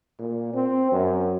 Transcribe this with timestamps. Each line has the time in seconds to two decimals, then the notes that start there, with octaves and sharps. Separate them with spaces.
0.19 A#2
0.54 C4
0.92 F#2